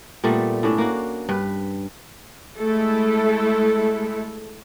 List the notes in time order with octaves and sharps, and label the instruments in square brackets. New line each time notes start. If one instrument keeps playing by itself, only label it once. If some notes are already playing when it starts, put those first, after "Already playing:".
[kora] A#2 G3 A3 B3
A2 C#4 D4
A#3 F#4
G2 B4
[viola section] G#3 A3 E4 A4